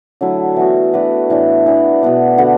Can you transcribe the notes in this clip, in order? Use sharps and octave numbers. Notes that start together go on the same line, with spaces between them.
D3 F#3 A3 E4
E3 B3 F#4
A3 D4 F#4 B4
A2 E3 D4
E3 B3 D4
B2 B3 D4
D3 B3 F#4